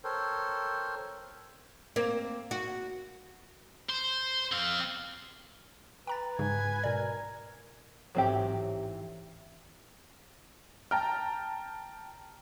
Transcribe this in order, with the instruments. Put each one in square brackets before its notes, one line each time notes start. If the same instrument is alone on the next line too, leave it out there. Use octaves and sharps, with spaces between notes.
[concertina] A4 A#4 C5 C#5 G5
[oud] A#3 C4
F#4
[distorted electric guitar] C5
C4 F5
[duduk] B4 [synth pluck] G5 A#5 A6
[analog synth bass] G#2 [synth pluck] C#3 [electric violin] G#5 G#6
[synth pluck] B2 D5 [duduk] A#4
[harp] A1 G#2 [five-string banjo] F#3 C4 G4
[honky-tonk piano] G5 [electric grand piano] A5 A#5 F6